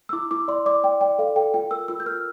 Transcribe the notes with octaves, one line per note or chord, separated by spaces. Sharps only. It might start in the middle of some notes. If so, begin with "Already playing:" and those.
E6
E4 D6
E4 D6
D5 C6
D5 D6
D5 G5
D5 G5
A4 F5
A4 G5
F4 G5
A#4 E6
F4 E6
G6
A#4 F6